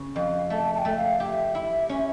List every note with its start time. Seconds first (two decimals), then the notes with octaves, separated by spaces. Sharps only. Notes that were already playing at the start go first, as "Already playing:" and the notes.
Already playing: C#3
0.16 F2 F5
0.50 A3 A5
0.74 A5
0.79 G5
0.85 A3
0.96 F5
1.20 G4 E5
1.55 E4
1.89 C#4